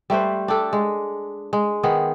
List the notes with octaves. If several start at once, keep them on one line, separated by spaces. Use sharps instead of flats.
G3 A3 B4 C5
D4 G4 A4
G#3
G#3
D#3 B3 G#4